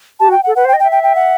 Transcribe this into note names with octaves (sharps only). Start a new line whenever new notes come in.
G4 A5
F#4
G5
F#5
A4
B4 F#5
C5
G5
D#5
G5
E5
G5
G5
F#5